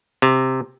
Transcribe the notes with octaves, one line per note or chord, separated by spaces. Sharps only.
C3